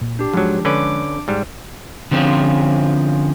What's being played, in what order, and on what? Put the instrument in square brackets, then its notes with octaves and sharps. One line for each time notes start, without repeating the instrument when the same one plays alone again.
[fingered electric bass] A#2
[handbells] D4 G4
[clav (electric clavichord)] G#2 F#3 [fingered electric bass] F3 G#3
[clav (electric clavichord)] D3 C#4 B4 [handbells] D4 D6 D7
[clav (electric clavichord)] G#2 G3
[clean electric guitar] D3 F3 C4 C#4 F4 G#4